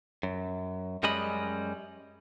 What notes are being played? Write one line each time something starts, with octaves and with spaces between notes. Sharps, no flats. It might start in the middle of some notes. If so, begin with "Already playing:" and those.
F#2
F#2 G3 G#3 C#4 D#5 B5